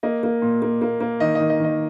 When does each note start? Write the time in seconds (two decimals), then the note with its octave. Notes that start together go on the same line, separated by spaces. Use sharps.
0.03 A#3 D#5
0.23 A#3
0.42 A#2
0.62 A#3
0.82 A#3
1.01 A#3
1.20 D#3 D#5
1.35 D#3 D#5
1.50 D#5
1.60 D#3 D#5